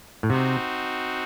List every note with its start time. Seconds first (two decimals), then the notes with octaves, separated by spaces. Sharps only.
0.23 A2
0.30 C3 C4 D#4 F#4